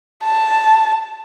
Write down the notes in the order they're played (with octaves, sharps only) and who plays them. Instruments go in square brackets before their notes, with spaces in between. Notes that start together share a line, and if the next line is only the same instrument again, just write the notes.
[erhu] A5